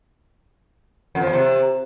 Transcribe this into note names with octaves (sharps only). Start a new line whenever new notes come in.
F2
F3
E2
C3